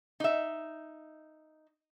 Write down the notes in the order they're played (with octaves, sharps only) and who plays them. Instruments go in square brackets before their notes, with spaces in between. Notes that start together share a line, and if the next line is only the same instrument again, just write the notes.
[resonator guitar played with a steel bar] D#4 E5